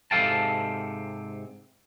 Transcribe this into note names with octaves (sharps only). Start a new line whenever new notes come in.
G#2 C3 A4 F5 G5 A5